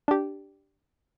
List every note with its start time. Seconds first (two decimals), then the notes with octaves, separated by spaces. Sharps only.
0.08 D4 G4